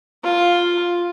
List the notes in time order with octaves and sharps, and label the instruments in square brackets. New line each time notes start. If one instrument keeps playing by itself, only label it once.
[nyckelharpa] F4